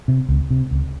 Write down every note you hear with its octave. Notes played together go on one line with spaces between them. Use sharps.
C3
C#2
C3
C#2